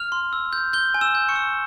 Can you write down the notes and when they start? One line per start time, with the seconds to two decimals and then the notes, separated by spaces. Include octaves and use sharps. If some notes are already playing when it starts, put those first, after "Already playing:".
Already playing: F6 F7
0.12 C6
0.33 E6
0.53 G6
0.73 G6 G7
0.94 G#5
1.01 E6 E7
1.15 G6
1.29 C#6 C#7
1.36 E6